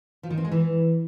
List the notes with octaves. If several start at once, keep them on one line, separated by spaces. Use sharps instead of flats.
F3
D#3
C4
G#3
E3